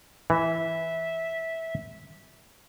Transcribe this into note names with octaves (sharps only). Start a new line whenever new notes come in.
E3 E5